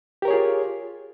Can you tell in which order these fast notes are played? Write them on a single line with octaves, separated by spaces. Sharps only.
G4 A#4 C#5 G#4 F4